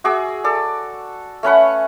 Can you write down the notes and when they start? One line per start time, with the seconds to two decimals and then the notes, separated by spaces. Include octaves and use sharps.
0.04 F#4 G#4 D6 E6
0.44 A4 D5
1.43 A3 C#4 B4 F#5